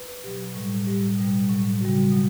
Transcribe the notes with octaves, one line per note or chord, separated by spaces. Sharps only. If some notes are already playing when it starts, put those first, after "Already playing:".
Already playing: B4
B2 F#3 G4
A2 G3
A2 G3 G4
B2 G3
A2 F#3
C#3 G3 F#4
B2 F#3